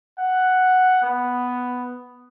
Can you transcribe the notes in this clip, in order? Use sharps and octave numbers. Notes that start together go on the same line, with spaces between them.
F#5
B3